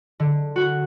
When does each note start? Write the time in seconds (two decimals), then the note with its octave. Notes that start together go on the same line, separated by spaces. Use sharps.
0.20 D3
0.56 F#4